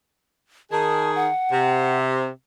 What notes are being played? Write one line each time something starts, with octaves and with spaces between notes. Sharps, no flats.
D#3 G#4 A5
F#5
C3